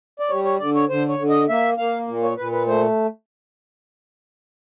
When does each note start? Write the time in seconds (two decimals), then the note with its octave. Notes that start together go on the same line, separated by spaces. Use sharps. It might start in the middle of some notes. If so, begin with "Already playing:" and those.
0.20 D5
0.30 G3 C#5
0.45 C#5
0.60 D3 D5
0.75 C#5
0.89 D3 C5
1.09 C#5
1.19 D3
1.30 D#5
1.49 A#3 E5
1.78 A#3 F5
2.08 A#2
2.23 C#5
2.37 A#2 B4
2.52 B4
2.67 A3 C5